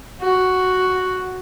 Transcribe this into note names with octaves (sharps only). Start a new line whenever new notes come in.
F#4